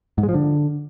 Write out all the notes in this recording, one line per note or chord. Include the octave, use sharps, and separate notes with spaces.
G#2
G#3
F3
D3